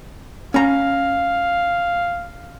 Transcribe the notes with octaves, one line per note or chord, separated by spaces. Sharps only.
C#4 F5 A#5